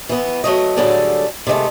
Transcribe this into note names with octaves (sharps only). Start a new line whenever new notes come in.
E3 B3
F#3 A3 D#5
A2 D3 F#3 G3 G#4 A4
C3 D#3 G#3 A3